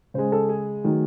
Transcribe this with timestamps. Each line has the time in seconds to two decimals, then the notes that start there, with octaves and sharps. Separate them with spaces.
0.14 C#3 G#3 C5
0.32 A4
0.49 G#4
0.84 D#3 F#3 A3